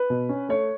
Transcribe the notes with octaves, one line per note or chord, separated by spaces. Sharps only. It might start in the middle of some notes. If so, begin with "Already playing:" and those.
Already playing: B4
B2
C#4
A3 C#5